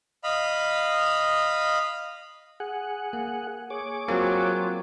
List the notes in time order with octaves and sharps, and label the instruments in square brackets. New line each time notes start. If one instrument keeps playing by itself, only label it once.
[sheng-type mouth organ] D#5 F5 B5
[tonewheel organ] G#4 F#5
[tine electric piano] A#3
[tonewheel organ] G#4 C#5 D6
[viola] F#3 F4 [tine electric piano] A#3 C4